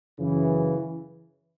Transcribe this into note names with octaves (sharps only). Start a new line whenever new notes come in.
F#2 C#3 E3